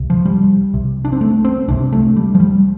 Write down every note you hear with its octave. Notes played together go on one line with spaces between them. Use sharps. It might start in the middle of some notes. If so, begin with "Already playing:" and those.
Already playing: C2 C3
F3
G3
C2 C3
D4
C4
A3
C4
C2 C3 D4
A3
G3
F3
G3